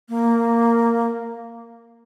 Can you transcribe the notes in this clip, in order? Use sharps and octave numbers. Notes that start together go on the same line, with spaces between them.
A#3